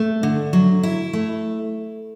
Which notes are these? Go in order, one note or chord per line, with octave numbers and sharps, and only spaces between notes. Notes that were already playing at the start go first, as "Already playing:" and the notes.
Already playing: A3
D3
F#3
E4
A3